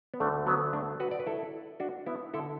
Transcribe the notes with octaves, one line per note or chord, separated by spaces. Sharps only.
B3
D2 D3 A3 D4
F#3 B3
A3 D4
F#4 B4
D5
B4
E4 A4
D4 F#4
B3 E4
D3 E4 A4